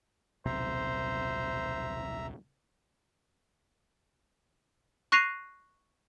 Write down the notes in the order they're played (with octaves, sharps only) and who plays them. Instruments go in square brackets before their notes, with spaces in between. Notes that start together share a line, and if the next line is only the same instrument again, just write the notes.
[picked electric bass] D#1 B1 C3 [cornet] C5 [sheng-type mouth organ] E5 A#5
[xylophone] C#6 F#6 A#6 C7 D#7 F7